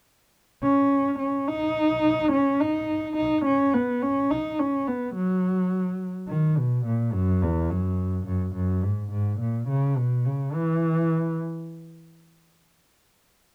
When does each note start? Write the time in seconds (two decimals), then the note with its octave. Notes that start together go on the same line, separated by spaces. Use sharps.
0.63 C#4
1.19 C#4
1.47 D#4
2.32 C#4
2.60 D#4
3.17 D#4
3.45 C#4
3.74 B3
4.02 C#4
4.31 D#4
4.59 C#4
4.87 B3
5.15 F#3
6.29 D#3
6.57 B2
6.86 A#2
7.14 F#2
7.43 E2
7.70 F#2
8.27 F#2
8.55 F#2
8.84 G#2
9.12 G#2
9.41 A#2
9.69 C#3
9.97 B2
10.25 C#3
10.54 E3